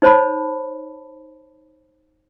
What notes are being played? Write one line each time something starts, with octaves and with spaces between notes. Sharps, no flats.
D#4 C5 C#5 A5 B5